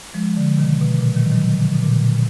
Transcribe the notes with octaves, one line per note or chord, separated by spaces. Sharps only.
F3 G#3
D3 F3
B2 D#3
B2
A#2
D#3 F#3
D#3 F#3
D3 F3
B2
A#2 D3